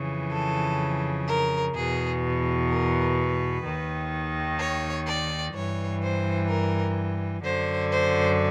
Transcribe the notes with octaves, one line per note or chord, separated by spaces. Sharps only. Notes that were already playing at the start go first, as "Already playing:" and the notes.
Already playing: F2 C#3 E3
A4
A#4
E2 B2 G#4
A#4
B4
D#2 D#3
C#5
D5
G2 E3 C#5
C5
A#4
F#2 D3 C5
C5